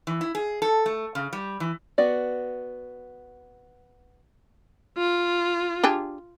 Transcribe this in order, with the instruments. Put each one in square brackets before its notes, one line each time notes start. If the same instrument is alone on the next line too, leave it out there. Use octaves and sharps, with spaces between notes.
[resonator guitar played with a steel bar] E3
E4
G#4
A4
A3
C#3
G3
E3
[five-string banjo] B3 F#4 D5
[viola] F4
[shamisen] D4 G4 G#4